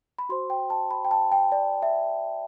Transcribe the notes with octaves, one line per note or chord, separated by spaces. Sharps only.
B5
F#4 C5 C6
G5
A5
B5
G5
A5
G5
D5
E5